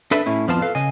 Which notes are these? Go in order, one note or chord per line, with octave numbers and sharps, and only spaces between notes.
D4 A4 B4 D5 E5
A2 C#4 E4
F2 F3 B3 F4 C5 A5
A4 B4 F5
C#3 D#5 G#5